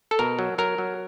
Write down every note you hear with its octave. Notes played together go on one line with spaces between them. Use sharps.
A4
B2 A#4
F#3
F#3 A#4
F#3